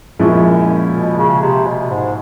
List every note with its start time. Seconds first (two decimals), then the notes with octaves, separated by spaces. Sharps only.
0.19 F#2 A#2 F3 G#3 C#4 E4
0.94 B2
1.17 C#3
1.41 C3
1.66 B2
1.90 G#2